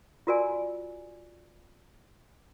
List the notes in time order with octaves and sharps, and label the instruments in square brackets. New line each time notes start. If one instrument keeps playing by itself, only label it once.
[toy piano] F4 F#4 A#4 D5 G#5